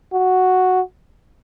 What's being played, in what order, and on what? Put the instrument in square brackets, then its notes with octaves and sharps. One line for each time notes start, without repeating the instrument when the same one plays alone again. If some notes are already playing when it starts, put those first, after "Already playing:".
[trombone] F#4